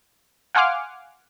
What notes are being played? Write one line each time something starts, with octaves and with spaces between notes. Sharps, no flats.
F5 F#5 G#5 C6 D6 F6